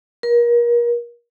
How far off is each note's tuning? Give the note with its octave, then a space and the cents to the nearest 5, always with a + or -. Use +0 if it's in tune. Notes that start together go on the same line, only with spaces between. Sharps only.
A#4 +35